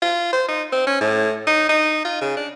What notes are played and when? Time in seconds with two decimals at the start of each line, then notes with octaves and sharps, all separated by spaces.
0.02 F4
0.33 C5
0.48 D#4
0.72 C4
0.87 C#4
1.01 A2
1.47 D#4
1.69 D#4
2.05 F4
2.21 C#3
2.37 D4